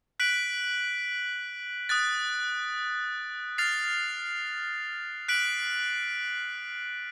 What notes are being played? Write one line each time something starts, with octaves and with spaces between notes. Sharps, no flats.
F#6 B6 D7 F#7
D#6 F#6 A6
F6 A6 C7 F7
F#6 B6 D7 F#7